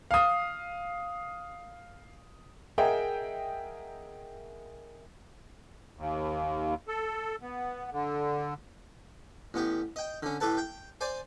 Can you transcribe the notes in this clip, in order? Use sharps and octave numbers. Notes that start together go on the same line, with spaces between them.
F5 D#6
G#4 A#4 D#5 E5 F#5 G5
D#2
A4
B3
D3
A1 B3 G4
D#5 G5
D3 C#4
A2 G4 A4 B4 A5
G5
C5 D5 G#5